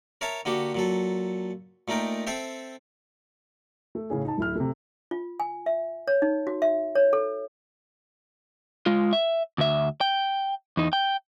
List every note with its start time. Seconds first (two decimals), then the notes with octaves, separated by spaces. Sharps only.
0.21 A#4 C#5 E5 A5 A#5
0.45 D3 A#3 F#4 G4
0.75 A#2 F#3 A4
1.88 A#2 A3 D#4 A#4 G5
2.27 C4 A4 C5 E5 G5
3.95 A3
4.10 A2 C#3 C#4 G#4
4.25 D#4 A5
4.38 D1 E4 F6
4.56 C3 A3
5.11 F4
5.40 G#5
5.66 E5
6.08 C#5
6.22 D#4
6.47 F#4
6.62 E5
6.95 C#5
7.13 A4
8.86 G#3 F4
9.13 E5
9.58 D2 E5
10.01 G5
10.77 E2 D#4
10.93 G5